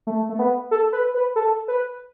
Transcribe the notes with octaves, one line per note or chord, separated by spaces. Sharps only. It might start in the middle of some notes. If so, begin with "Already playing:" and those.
A3
A3
B3
A4
B4
B4
A4
B4